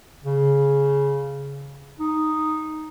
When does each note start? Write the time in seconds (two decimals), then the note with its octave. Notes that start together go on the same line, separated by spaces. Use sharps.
0.24 C#3
1.99 D#4